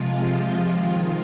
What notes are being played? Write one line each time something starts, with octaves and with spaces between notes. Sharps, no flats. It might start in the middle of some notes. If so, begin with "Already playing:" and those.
Already playing: C3 F3 G#3 F4
D#3 G#3 F4